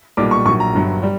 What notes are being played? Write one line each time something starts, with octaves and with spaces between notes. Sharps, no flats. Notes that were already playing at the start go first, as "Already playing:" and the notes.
B1 A#2 G3 D6
C#6
A#1 A#2 F#3 C#6
A#5
G1 G2 F#3
G3